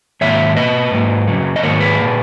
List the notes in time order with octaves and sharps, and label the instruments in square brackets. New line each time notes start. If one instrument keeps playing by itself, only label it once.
[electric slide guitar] G#2 D#3 F#3 A#3 C#5 E5
B2 A#3 B4 D#5
G#2 F#3 A#3
F#2 C#3 F#3
D#5
G#2 D#3 F#3 A#3 A#4 C#5
G#4 B4
A#2 A#3